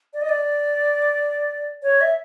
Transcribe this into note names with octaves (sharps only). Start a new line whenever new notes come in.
D5
D#5
D5
C#5
E5